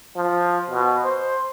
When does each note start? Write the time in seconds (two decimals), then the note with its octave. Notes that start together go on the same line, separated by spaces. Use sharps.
0.16 F3
0.70 B2
1.05 C5